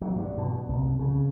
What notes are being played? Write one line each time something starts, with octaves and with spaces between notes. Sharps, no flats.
F#3
G2
B2
C2
C#3